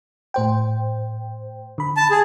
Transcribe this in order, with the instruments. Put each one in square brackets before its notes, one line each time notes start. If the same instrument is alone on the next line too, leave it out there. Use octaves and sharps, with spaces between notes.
[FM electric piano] A2 C5 G5
D3 B5
[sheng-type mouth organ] A5
G#4